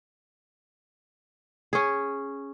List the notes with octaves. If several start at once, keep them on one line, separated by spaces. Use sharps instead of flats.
C#4 G#4